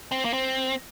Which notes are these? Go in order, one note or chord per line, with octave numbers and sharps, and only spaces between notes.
C4
A#3
C4